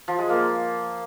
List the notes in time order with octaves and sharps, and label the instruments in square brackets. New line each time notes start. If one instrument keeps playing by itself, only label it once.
[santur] F3
G#3
A#3